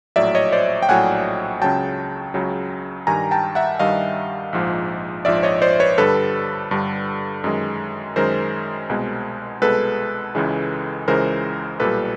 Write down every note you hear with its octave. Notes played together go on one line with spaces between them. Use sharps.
A#1 A2 F#3 D5 E5
C#5 D#5
C5 D5
G5
A#1 A2 F#3 F#5 G#5
C#2 C#3 F#3 G5 A5
C#2 C#3 F#3
G2 D#3 G3 G#5 A#5
G5 A5
E5 F#5
G2 D#3 G3 D#5 F5
A#1 G#2 F3
A#1 G#2 F3 D5 E5
C#5 D#5
C5 D5
B4 C#5
G2 D3 G3 A4 B4
G2 D3 G3
F#2 D#3 G#3
F#2 D#3 G#3 A#4 C5
C2 B2 G#3
C2 B2 G#3 A4 B4
C#2 C#3 E3 G#3
C#2 C#3 E3 G#3 A#4 C5
B1 A#2 G3 A4 B4